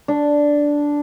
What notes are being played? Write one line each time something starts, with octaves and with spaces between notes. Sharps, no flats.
D4